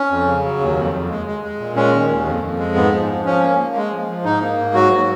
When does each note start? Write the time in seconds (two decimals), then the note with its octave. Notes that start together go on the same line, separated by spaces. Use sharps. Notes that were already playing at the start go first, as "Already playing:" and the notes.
Already playing: C#4
0.11 F2
0.27 C#3
0.44 F#3
0.60 D#2
0.76 F2
0.93 F2
1.09 G#3
1.26 G#3
1.43 G#3
1.59 A#2
1.76 G#3 C#4
1.93 D#3
2.10 D#2
2.26 F2
2.43 F2
2.58 G#3
2.75 G#2 B3
2.92 F3
3.08 F3
3.25 F3 C#4
3.42 A#3
3.58 A#3
3.75 G#3
3.91 F3
4.08 F3
4.24 G#2 D#4
4.41 A#3
4.58 G#2
4.74 F#3 F#4
4.91 F#3